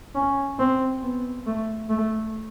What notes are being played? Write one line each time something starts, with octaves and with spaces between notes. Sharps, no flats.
C#4
C4
B3
A3
A3